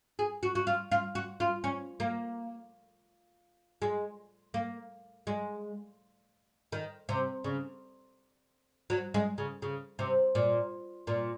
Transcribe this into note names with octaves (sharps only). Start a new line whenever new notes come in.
G#4
F#4
F#4
F4
F4
F#4
F4
C#4
A#3
G#3
A#3
G#3
D#3
C3
C#3
F#3
G#3
C#3
C#3
C3
A#2
A#2